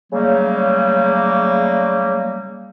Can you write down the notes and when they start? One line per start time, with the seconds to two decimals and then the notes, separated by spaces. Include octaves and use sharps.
0.12 C#3 F#3 G3 A3 A#3